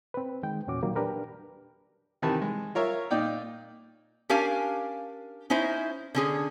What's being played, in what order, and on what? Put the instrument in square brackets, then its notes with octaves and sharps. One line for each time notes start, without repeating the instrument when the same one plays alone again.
[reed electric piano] C4 B4
D#3 G#3 G5
E2 A#2 C#4 F#4 D6
A#2 D#3 F#3 G3 A#3
D4 G4 A#4 B4
[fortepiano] C3 D#3 E3 B4 A5
G#3
F4 A#4 C#5 E5
A#2 D#4 D5 G5
[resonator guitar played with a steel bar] C#4 D4 G4 A#4 F5 G#5
C#4 D#4 E4 C5
D3 C#4 G#4